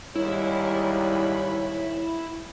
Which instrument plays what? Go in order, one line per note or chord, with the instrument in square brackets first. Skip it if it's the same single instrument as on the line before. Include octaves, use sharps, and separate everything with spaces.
[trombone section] D#2 G#2 [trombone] G3 [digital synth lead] E4 [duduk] C#5